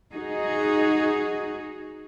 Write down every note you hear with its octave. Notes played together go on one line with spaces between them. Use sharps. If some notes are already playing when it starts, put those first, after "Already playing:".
D#4 F#4 G#4